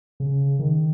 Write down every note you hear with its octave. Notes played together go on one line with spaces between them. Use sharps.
C#3
D#3